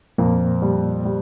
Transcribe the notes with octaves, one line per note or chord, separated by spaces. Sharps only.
F2 A#2 A#3
G3
G3